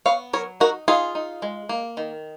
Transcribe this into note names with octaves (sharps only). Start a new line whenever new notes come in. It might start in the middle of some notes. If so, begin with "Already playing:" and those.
B3 C#5 F5
F#3 A#4 C#5
D#4 F#4 A#4
D#4 F4 G#4
D#4
G#3
A#3
D#3